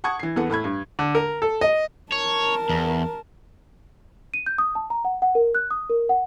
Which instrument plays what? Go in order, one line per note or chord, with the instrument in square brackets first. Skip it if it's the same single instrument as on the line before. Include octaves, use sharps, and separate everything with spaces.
[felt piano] F#5 A5 C#6 D#6 G#6
E3 C7
E2 B3 A4 F#5
A2 A3 B5 G#6
G2
[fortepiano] D3
A#4
A4
D#5
[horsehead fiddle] A#4 A5 [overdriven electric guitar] C#5
[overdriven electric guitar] E2
[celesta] D#7
G6
D#6
A5
A#5
F#5
F#5
A#4
F#6
D#6
A#4
F#5